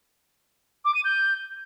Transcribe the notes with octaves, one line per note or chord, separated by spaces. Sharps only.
D6
D#7
G6